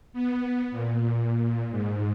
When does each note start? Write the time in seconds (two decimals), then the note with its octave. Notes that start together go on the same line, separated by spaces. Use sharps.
0.13 B3
0.71 A#2
1.70 G#2